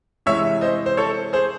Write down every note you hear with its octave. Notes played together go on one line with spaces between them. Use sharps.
C3 E3 G#3 C#5 E5
C5 D#5
C5
A4 C#5
G#4 C5